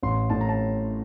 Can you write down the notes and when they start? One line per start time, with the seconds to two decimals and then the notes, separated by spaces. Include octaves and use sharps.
0.02 A1 C6
0.30 A2 A5
0.41 A#5
0.49 A5